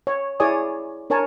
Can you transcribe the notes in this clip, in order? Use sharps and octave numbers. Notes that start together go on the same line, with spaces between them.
C#5
E4 G#4 C#5 D5 G#5 D#6
D4 A#4 C#5 G#5 A5